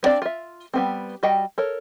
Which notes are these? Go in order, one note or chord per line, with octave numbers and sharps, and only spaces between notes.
B3 C4 D4 D5 F5
F4 E5
G3 B3 C4
G3 F#4 D#5 G5
A4 A#4 C#5